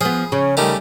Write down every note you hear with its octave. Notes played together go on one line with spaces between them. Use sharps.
F3 B3 G#4
C#3 C#4
D#3 G3 A3 C#4